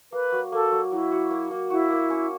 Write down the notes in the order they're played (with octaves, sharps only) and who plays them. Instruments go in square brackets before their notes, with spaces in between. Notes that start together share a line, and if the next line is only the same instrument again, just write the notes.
[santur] A#3 [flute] B4
[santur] F#3
[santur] A#3 [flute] A4
[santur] F#3
[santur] F#3 [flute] E4
[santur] F#4
A#3
A#3
[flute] E4 [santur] F#4
[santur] A#3
C#4